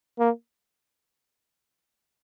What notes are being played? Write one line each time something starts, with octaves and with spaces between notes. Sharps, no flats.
A#3